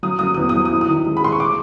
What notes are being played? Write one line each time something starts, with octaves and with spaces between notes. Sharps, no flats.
F#3 D#6
F#3 D#6
D#6
E2
D#6
F#3
D#6
E4
D#6
D#3
G#3
B5
G#3 C6
C#6
D6